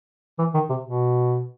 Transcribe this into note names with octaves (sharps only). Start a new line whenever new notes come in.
E3
D#3
C3
B2